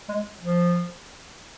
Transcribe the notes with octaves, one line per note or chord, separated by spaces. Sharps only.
G#3
F3